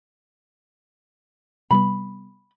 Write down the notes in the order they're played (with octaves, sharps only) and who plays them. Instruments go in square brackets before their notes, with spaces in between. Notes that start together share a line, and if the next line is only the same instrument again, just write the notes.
[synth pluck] C3 G3 B3 [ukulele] B5